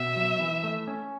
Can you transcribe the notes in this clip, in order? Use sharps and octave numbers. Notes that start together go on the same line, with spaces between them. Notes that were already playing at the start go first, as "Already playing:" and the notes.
Already playing: B2 E5
F#3
E3
A3
C#4